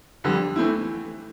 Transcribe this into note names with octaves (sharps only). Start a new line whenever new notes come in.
F2 D3 G3
E3 A3 C4 E4